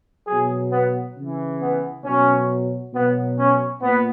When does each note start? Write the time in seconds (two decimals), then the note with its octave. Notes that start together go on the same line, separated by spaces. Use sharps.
0.27 B2 F#3 G#4
0.72 B3
1.17 C#3 E3
1.61 B3
2.05 B2 F#3 C#4
2.94 B2 F#3 B3
3.38 C#4
3.81 A#2 B3